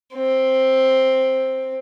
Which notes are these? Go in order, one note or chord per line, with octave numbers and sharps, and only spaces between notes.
C4